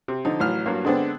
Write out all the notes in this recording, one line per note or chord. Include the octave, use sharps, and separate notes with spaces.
C3
D3 F3 D#4
A1 F#3 F6
G2 F#3 A#3
D3 G#3 B3 C4 D4